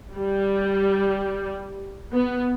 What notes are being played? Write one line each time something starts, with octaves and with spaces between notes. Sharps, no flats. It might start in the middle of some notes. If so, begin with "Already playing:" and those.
G3
B3